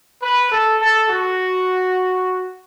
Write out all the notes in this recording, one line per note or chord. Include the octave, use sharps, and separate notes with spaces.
B4
A4
A4
F#4